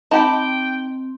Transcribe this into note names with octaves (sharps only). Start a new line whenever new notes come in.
C4 D#4 G4 G5 A5 B5